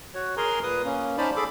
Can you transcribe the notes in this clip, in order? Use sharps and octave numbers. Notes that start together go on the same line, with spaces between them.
F#4 C#5
G#4 A#4 G#5 A#5 C6
A#2 B4 D#6
A#3 C#4
C#4 D#4 C5 D5 A5 B5
G#4 A4 B5 D6